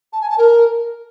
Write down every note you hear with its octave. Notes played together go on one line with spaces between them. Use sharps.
A5
G#5
A5
A#4